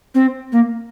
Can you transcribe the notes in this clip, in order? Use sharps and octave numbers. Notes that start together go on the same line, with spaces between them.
C4
A#3